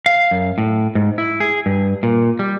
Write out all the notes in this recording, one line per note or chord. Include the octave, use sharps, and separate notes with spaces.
F5
F#2
A2
G#2
E4
G#4
G2
A#2
G3